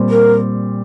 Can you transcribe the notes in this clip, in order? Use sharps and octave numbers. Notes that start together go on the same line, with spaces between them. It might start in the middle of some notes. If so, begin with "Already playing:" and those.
Already playing: A#2 G3 C4
A#4